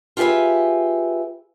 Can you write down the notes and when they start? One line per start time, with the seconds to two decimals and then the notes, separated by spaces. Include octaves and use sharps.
0.17 F4 G4 G#4 B4 E5